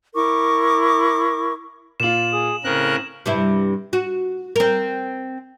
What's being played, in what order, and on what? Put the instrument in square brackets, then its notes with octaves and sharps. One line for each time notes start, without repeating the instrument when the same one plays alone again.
[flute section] E4 A#4 C#6 D6
[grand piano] A#2 F4 [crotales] E7 F#7
[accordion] G#4 D#6
[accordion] A2 [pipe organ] C#3 A#4 F#6 [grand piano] C4
[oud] G2 C3 E4
F#4
C4 A#4